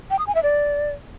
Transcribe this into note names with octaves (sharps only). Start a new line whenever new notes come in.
G5
D#6
G#5
E5
D5